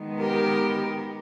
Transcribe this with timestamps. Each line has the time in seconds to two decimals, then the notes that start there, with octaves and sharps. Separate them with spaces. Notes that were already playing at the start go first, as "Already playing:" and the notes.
Already playing: D#3 G#3 B3
0.19 G4 A#4